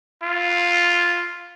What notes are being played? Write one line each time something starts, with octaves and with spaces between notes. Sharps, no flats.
F4